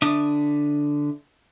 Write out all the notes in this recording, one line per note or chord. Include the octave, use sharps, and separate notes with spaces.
D3 D4 E5 D6 D#6